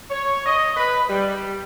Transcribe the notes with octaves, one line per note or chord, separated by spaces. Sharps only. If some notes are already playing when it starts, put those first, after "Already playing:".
C#5
D#5
B4
G3